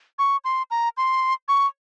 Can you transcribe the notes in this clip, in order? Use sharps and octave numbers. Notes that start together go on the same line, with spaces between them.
C#6
C6
A#5
C6
C#6